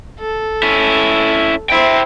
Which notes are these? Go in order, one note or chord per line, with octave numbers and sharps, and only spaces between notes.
A4
C#4 E4
E4 C5 E5 G5